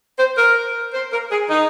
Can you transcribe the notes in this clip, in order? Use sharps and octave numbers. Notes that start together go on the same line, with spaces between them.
C5
A#4
C5
A#4
G#4
D#4